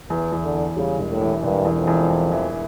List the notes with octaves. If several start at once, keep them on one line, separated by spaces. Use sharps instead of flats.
E2 E3
E2
D3
E2
C#3 G3
E1
A2
E3
E1 G2
E2
F2
E2
E2
E3